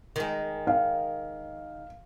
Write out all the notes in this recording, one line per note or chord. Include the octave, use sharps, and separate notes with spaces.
D#3 G#3
F5